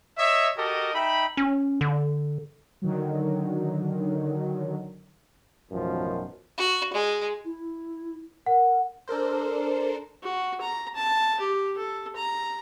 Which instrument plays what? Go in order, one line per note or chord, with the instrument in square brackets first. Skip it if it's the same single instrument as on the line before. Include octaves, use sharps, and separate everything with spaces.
[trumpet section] C#5 D#5 E5
F#4 G4 A4 A#4 D#5
D#4 E5 G5 B5
[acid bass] C#4
D3
[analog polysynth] D3 D#3 F#3
[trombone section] A1 F#2 B2 D#3 F3
[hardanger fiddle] F#4
G#3
[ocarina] E4
[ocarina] A#4 [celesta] F#5
[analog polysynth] D4 A4 A#4 C5
[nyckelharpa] F#4
A#5
A5
G4
A4
A#5